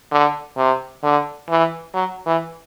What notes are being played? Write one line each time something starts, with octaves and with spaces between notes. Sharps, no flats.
D3
C3
D3
E3
F#3
E3